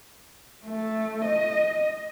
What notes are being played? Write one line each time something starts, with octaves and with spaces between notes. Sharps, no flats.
A3
D#5